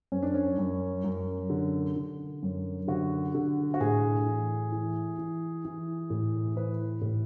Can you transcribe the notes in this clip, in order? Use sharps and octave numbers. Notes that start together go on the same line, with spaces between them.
F#2 C#4
D4
C#4
F#2
F#2
D3
D3
F#2
D3 F#4
D3
F#4
A2 G#4
E3
E3
E3
E3
A2
E3 B4
A2